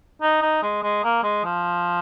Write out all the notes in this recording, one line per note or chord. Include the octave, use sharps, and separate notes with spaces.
D#4
D#4
G#3
G#3
A#3
G#3
F3